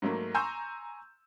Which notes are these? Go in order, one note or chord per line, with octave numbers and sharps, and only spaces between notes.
G#2 F#3 A3 A#3
G#5 A#5 C6 C#6 E6 G6